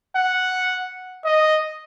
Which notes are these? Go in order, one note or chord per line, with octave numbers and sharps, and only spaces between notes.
F#5
D#5